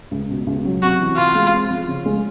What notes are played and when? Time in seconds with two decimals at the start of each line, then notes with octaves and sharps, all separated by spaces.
0.11 C#2
0.30 B2
0.47 C#2
0.65 F#3
0.82 C3 F#4
1.00 E3
1.17 C3 F4
1.35 G#3
1.53 C4
1.70 F3
1.88 C#3
2.06 G#3